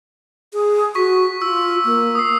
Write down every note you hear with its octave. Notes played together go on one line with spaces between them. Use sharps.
G#4
F#4 C#6 B6
F4 E6
A#3
D#6 C7